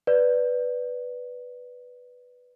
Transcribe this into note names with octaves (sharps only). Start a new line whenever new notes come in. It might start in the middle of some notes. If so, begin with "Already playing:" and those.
B4 D5